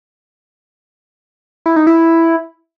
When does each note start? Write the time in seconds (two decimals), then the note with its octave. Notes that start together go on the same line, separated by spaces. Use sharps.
1.66 E4
1.76 D#4
1.87 E4